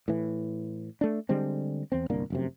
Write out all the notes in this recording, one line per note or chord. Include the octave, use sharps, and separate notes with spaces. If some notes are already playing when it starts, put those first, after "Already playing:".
A2 E3
A3 D4
D3 G3 G#3 C4
E2 C4
G1 C2 A#3 D4
F1 F#2 C3